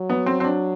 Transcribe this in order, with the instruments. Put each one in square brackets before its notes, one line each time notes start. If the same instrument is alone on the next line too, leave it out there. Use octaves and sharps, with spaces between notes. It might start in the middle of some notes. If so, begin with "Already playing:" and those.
Already playing: [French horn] F#3
[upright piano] B3
C4
C4
D4